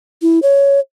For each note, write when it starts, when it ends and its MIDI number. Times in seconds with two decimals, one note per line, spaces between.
0.22 0.39 64
0.42 0.80 73